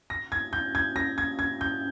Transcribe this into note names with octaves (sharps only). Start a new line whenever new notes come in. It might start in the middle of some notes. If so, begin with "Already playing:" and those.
A#6
G#6
G6
G#6
A#6
G#6
G#6
G6